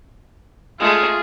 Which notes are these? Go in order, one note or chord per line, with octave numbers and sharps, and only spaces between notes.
G#3 A3 F4 G#4